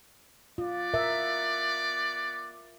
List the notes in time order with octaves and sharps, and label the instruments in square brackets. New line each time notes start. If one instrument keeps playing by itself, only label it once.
[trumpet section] B3 D5 [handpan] F4
[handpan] A#4 E5